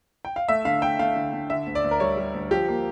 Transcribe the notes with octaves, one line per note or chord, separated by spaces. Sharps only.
G5
F5
A3 E5
D3 F5
A3 G5
A3 F5
D3
D3
D3 E5
D2
D5
D2
A#4
G3 C#5
G3
D2
F3 G4
A#3